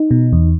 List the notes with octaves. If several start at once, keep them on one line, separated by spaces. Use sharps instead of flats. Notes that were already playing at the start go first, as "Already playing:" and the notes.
Already playing: D#4
B2
E2